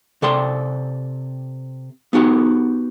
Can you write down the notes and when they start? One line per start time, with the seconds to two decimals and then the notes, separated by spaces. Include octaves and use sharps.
0.22 C3 A4 D5 G5 C6
2.13 B3 D#4 F#4 G4